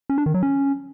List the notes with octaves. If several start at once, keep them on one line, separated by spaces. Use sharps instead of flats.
C#4
D4
D#3
F#3
C#4